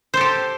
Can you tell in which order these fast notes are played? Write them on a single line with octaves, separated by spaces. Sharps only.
C5 A4 G4